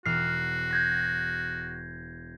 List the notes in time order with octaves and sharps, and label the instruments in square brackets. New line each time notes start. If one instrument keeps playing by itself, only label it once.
[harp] E1 F6 [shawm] F#4 [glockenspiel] C7
[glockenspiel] G6 G#6 A#6